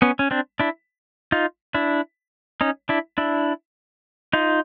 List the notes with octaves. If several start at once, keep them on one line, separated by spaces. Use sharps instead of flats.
B3 C#4
C#4
C4 D4
D4 E4
D#4 F4
D4 E4
C#4 D#4
D4 E4
D4 E4
D#4 F4